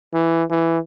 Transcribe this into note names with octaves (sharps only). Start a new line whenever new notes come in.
E3
E3